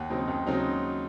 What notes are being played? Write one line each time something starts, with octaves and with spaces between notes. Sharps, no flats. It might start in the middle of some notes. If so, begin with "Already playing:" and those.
Already playing: D#2 F#5
C#3 F#3 C4 D#4
D#2
C#3 F#3 C4 D#4